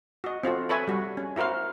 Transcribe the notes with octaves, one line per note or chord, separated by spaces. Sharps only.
F#4 D#5
C4 F4 F#4 A4
A4 B4 C#5 E5 G#5
G3 F#4
C#4
E4 F#4 A#4 C5 F5